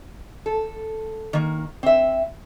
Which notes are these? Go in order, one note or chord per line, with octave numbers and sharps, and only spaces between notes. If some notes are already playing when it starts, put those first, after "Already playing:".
A4
D#3 A#3
C4 E5